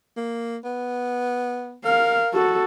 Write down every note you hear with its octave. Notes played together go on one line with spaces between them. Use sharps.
A#3
B3
A#4 F5
F#4 A4